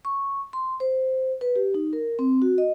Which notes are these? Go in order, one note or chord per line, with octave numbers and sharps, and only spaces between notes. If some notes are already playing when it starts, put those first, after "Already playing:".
C#6
C6
C5
B4
G4
D#4
A#4
C4
F#4
D#5